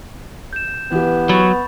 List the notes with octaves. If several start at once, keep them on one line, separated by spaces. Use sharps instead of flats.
G6 E7
E3 B3 G4
F#3 B5 C#6 A6